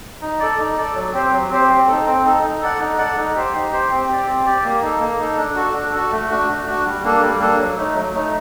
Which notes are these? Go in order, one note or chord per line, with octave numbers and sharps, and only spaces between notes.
D#4
A4 D5
D#4
A4 D5
F#3
C4 G4 C5
F#3
C4 G4 C5
C4
D#4 A4
C4
D#4 A4
D#4
A4 D5 F#5
D#4
A4 D5 F#5
D#4
G4 C5
D#4
G4 C5
C4
G4 D5
C4
G4 D5
A#3
D#4 A4
A#3
D#4 A4
D4
F#4 A4
D4
F#4 A4
A3
D4 F#4
A3
D4 F#4
G3
A#3 D4 A4
G3
A#3 D4 A4
F#3
A3 D#4
F#3
A3 D#4